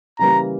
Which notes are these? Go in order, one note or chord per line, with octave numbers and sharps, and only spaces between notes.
C#3 E3 G3 A#3 A#5